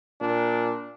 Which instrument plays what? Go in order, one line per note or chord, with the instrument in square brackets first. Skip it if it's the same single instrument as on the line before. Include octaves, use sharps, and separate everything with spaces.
[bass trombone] A#2 [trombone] D4